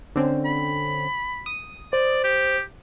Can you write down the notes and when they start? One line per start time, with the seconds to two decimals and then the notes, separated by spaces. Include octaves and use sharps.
0.16 D3 C4 C#4
0.45 B5
1.46 D#6
1.93 C5 D5
2.24 G4